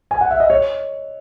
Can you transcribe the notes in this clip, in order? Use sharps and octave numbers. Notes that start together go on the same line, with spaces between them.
G#5
F#5
E5
D#5
C#5